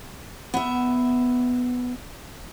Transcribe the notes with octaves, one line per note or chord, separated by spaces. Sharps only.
B3 E5